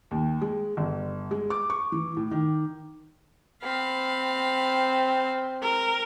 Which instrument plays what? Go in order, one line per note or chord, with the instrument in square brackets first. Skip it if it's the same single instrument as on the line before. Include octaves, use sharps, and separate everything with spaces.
[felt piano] D#2
G#3
G1
G#3
D6
C#6
E3
A2
D#3
[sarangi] C4 [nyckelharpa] F5 B5
[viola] A#4